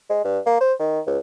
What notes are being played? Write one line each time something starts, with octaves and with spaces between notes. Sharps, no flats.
G#3
G2
A#3
C5
D#3
C#2